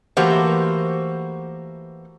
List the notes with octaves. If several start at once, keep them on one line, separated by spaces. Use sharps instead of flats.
E3 A3 A#3 F#4 G4 C5